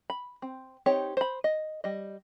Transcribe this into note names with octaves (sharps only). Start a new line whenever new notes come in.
B5
C4
C4 D#4 G4 C#5
C5 B5
D#5
G3 D#5